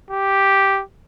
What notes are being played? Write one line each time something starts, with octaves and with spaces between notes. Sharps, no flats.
G4